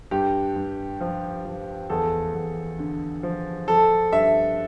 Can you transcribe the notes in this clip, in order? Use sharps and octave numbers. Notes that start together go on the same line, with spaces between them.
G2 G4
G2
F3
F3
E2 A4
E2
D3
F3
F3 A4
G2 E5